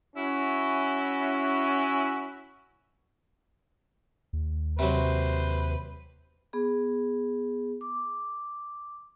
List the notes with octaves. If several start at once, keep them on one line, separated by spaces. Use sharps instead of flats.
C#4 E4 F#4
D#2
C3 F#3 B4 C5
B3 G#4
D6